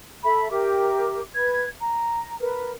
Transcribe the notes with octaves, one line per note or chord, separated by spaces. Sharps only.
A4 E5 B5
G4 A#4 E5 D6
B4 G#6
A#5
A#4 B4